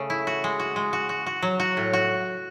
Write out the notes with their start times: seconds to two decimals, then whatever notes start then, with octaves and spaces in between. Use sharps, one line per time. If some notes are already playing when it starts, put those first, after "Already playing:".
Already playing: C#3 A3
0.10 E4
0.27 F#4
0.44 G#3
0.59 F#4
0.76 G#3
0.93 F#4
1.09 F#4
1.26 F#4
1.42 F#3
1.60 F#4
1.77 A2
1.93 F#4